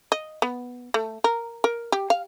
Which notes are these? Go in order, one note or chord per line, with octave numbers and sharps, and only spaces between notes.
D#5
B3
A3
A#4
A#4
G4
F5